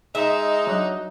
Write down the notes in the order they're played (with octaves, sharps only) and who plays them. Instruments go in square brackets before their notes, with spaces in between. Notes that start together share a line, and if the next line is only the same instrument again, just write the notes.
[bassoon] G#3 [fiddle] D#4 [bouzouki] E5
[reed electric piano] F#3 D4 F#6